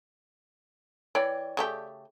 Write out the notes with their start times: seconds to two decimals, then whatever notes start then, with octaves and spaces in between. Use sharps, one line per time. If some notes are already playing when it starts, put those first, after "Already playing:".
1.15 E3 C#5 D5 G5
1.57 C#3 A3 G4